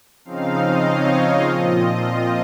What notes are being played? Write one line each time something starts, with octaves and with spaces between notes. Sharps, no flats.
C#3 F3 C4 D#4 F5
D#5
C#5
A#2 F3 C4 F4 D#5